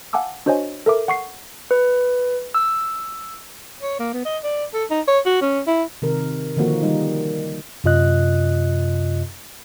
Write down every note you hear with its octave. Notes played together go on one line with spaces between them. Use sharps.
F5 F#5 G#5 A5 D6 E6
D4 F#4 C5 C#5 D#5 G#5
A4 A#4 E5 D6
F#5 C#6 C7
B4
E6
C#5
A#3
B3
D#5
D5
A4
D#4
C#5
F#4
C#4
E4
C3 D#3 A#4
D3 D#3 F3 A#3 F#4
D#3 G3 D#4
F#2 C3 F4 D#5 F#6